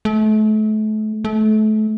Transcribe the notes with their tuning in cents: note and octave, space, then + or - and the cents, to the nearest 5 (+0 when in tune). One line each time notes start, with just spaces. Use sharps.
A3 -35
A3 -30